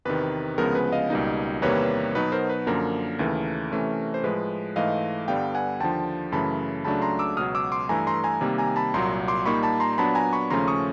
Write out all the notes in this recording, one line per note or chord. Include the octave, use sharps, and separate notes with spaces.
E2 C3 D#3 B4
D2 C#3 F3 G#3 B3 A#4
B4
D#5 F5
C#2 B2 G3 A#3 D#4
E2 C3 D#3 G3 A#3 B4 C#5
B2 F#3 B3 D#4 B4
A#4 C5
B4
F#2 D3 F3 A#3 A#4
D#2 C#3 E3 A3
C3 E3 A3 C#4
C5
A2 F3 G#3 B4
G#2 E3 A3 D#5 F5
G2 D3 G3 B3 F5 G5
F#5 G#5
D#2 D3 F3 G5 A5
F#2 C#3 E3 A3 A5 B5
C#2 C#3 F#3 A3 D4 A5 B5
A#5 C6
D6 E6
C#2 B2 F#3 D#6 F6
D6 E6
C6 D6
G2 E3 A3 G#5 A#5
A#5 C6
G#5 A#5
C3 D#3 G3 A#3
G#5 A#5
A5 B5
C2 A#2 F#3 A#5 C6
C6 D6
A#2 G3 A#3 D#4 B5 C#6
A5 B5
A#5 C6
A#5
A#2 F#3 B3 D4 A5 B5
G#5 A#5
B5 C#6
D#2 C#3 F3 A3 C#4 A#5 C6
C#6 D#6